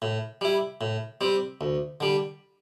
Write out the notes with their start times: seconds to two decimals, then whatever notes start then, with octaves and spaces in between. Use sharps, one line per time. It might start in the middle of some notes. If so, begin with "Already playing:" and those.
0.02 A2
0.41 G3 E4
0.81 A2
1.21 G3 C4
1.61 D2
2.00 D3 G3